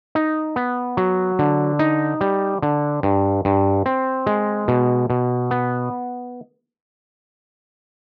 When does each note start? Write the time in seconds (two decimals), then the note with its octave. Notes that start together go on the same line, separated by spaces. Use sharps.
0.15 D#4
0.56 B3
0.97 F#3
1.39 D3
1.79 D#4
2.21 G3
2.62 D3
3.03 G2
3.45 G2
3.86 C4
4.26 G#3
4.68 B2
5.10 B2
5.51 B3